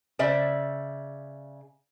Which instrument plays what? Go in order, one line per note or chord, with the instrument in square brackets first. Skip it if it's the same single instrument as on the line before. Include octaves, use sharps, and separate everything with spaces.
[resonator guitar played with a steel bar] C#3 C5 D5 E5